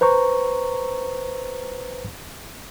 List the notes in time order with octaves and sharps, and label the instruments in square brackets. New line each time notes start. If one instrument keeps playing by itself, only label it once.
[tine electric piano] B4 C5 A#5 C#6